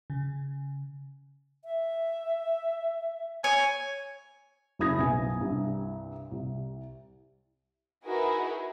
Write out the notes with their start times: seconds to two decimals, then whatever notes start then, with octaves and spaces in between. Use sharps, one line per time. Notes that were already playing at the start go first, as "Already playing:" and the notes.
0.10 C#3
1.65 E5
3.44 C#5 G#5
4.79 F#1 C#3 E4 D#6 G#6 A#6
4.98 B1 F#2 B3 G#5
5.41 C2 G2
6.32 C2
8.05 D#4 E4 F#4 G#4 A#4 B4